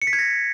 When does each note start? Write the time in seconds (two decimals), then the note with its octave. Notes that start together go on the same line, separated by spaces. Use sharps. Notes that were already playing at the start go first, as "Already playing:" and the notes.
0.02 C#7
0.07 B6
0.13 G#6
0.19 A#6